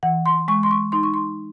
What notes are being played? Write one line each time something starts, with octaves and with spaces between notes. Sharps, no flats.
E3 F#5
C6
G#3 C#6
C6
C#6
D#4 C6
C#6
C6